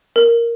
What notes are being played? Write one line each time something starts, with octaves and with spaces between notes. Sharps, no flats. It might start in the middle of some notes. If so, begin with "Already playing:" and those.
A#4